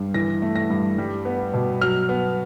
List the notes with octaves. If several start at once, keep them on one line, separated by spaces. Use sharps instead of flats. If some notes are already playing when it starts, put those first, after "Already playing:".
Already playing: G2
E3 A#6
A3
A#6
G2
G3
B3
B2
F#3 F6
B3